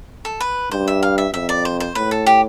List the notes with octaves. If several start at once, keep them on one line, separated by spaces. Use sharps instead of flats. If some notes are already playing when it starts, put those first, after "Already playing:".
A4
B4
G2 C5
E5
F5
E5
F2 E5
D5
C5
C5
A2 B4
A4
G4